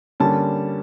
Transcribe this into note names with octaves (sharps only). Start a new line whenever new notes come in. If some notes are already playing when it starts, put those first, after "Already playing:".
D3 G3 A#3 C#4 A5